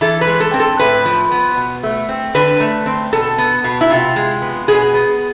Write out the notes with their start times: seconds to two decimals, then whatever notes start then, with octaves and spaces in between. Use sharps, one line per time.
0.01 E3 A4
0.21 B4
0.27 G#3
0.40 A4
0.54 C4
0.60 A4
0.79 A2 B4
1.05 F3
1.31 B3
1.57 B2
1.83 A3
2.09 C4
2.35 D3 B4
2.60 A3
2.86 C4
3.13 B2 A4
3.38 B3
3.64 B2
3.81 E4
3.90 C3 F4
4.16 G#3
4.42 B3
4.68 B2 G#4
4.94 B3